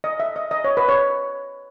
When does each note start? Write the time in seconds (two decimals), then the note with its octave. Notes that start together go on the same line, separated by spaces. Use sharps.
0.04 D#5
0.20 E5
0.36 D#5
0.51 D#5
0.64 C#5
0.77 B4
0.89 C#5